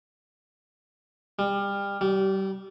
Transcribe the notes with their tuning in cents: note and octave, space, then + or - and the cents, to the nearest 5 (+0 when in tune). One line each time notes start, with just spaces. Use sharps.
G3 +30
G3 -25